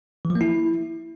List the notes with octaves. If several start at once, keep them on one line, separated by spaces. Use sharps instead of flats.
E3
F3
A#3
E4